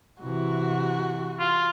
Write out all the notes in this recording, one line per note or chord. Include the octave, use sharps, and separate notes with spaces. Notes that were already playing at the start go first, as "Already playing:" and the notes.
C3 E3 F#4
F4